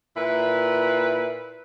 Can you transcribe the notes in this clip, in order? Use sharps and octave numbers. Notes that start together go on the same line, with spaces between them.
A#2 E4 B4